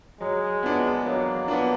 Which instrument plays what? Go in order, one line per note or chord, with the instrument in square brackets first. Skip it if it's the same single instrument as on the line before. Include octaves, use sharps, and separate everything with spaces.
[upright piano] F#3 [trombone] G#3
[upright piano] B3 D4
[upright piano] F#3 [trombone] A#3
[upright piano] B3 D4